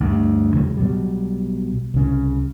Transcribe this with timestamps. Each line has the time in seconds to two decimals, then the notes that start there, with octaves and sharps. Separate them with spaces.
0.01 D2 G2
0.54 E2 C#3 F#3 G#3
0.77 B1 B2 F#3 G3
1.94 C2 C#3